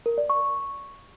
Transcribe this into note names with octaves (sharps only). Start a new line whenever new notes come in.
A#4
D5
C#6